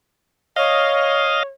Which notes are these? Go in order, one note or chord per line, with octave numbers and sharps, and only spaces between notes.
C#5 D#5 F5